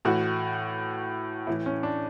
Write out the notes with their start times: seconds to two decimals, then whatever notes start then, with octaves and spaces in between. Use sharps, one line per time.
0.05 A2 E3 F#4
1.47 A2 E3 E4
1.66 C#4
1.83 D4